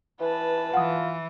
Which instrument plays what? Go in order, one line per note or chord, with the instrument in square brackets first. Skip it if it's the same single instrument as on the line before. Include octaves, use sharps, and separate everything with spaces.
[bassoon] E3 [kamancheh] B4 A5
[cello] E3 [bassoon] F4 [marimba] F#5 D#6